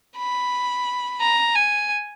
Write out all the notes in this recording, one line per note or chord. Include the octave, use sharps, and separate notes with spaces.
B5
A#5
G#5